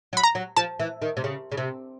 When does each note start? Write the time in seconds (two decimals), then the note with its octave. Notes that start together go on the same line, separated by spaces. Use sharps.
0.13 F#3
0.17 B5
0.23 A#5
0.35 F#3
0.57 F3 A5
0.80 E3
1.02 D#3
1.17 C3
1.24 C#3
1.52 C#3
1.57 C3